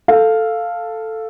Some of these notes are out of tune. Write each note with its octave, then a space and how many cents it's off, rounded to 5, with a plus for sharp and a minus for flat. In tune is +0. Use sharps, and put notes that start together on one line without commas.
A4 +5 F5 +0